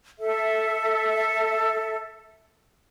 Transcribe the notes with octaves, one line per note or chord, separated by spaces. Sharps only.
A4 E5